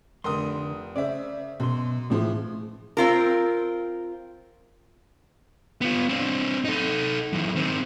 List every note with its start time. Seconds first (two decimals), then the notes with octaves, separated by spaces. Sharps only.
0.24 F1 D3 A#4 C6 D#6
0.96 C#3 C5 D5 E5
1.60 F#2 B2 C6
2.10 A2 E3 F3 G#3
2.97 C4 F4 A#4
5.81 B3 F4
6.09 C4 D4
6.65 D#4 A4
7.33 F#2 E3
7.56 D#3 C4